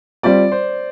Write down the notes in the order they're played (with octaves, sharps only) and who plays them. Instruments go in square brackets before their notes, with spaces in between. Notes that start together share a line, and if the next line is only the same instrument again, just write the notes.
[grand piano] G3 C4 F4 [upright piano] D5
[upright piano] C5